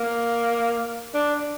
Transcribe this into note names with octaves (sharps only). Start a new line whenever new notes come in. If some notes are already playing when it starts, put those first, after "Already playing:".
Already playing: A#3
D4